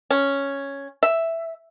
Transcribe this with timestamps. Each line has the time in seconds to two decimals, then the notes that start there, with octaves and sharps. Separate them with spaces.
0.11 C#4
1.03 E5